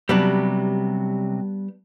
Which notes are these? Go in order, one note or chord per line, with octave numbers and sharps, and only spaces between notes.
C3 F#3 G3 B3 D4